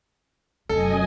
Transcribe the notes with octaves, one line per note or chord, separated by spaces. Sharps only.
F1 F#2 A4 D#5 G#5